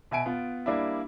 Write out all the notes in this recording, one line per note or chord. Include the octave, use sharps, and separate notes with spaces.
B2 E5 G#5 D7
B3 F4
G3 A#3 D4 E4